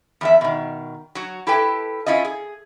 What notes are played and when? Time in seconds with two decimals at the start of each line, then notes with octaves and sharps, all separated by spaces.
0.21 E2 G3 E5
0.41 B2 D#3
1.15 F#3 F#4
1.47 E4 G4 A4 B4 G5
2.06 C#4 E4 F4 D#5
2.25 G#4